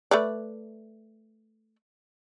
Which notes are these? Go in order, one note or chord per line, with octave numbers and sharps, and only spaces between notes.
A3 B4 D5